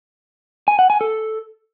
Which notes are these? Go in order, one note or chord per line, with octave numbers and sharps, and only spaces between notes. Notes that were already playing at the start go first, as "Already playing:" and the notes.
G#5
F#5
G#5
A4